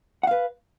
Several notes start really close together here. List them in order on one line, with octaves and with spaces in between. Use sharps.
F#5 F5 B4